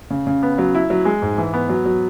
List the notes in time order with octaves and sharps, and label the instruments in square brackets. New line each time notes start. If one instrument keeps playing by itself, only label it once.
[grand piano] C#3
C#3
B3
F#3
E4
F#3
G#3
G#2
E3
B3
F#3
F#3